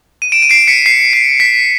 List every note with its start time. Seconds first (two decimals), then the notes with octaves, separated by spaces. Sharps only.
0.22 D#7
0.32 D7 E7
0.42 D#7
0.50 C7 D7
0.67 B6 C#7
0.86 C7
1.13 C7
1.40 B6